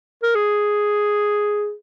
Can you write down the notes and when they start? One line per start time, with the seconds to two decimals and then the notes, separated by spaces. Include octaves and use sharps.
0.23 A#4
0.35 G#4